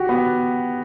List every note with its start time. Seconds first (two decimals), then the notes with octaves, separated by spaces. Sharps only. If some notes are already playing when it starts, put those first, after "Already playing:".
Already playing: F#4 G4
0.09 B3